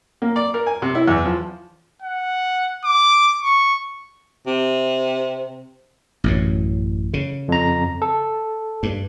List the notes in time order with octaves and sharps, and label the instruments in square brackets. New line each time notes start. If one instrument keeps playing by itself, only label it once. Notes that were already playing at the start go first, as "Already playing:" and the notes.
[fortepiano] A#3
D5
A#4
G#5
C3
E4
E2
F3
[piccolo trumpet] F#5
D6
C#6
[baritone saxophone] C3
[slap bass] A1 F#2 A2
C#3
[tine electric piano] F2 A#5
A4
[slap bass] G2